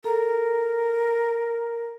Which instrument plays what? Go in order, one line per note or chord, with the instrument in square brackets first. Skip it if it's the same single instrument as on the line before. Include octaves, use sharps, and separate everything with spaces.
[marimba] A4 A#5 [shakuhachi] A#4